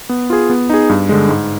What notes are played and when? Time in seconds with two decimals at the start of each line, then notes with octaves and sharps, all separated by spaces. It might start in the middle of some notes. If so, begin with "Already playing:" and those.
0.09 B3
0.30 F4 G#4
0.50 B3
0.70 D#4 G#4
0.89 G2
1.09 D3 G#3
1.29 G#2